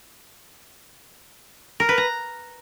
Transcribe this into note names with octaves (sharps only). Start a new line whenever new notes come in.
A#4
B4
A#5